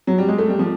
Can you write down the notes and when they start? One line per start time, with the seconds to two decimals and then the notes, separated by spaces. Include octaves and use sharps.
0.07 F#3
0.18 G3
0.28 G#3
0.38 A3
0.49 G3
0.59 F3